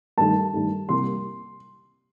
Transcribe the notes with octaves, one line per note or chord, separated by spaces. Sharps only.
G2 D#3 A3 A5
G2 D#3 A3
C2 C3 G3 A#3 C6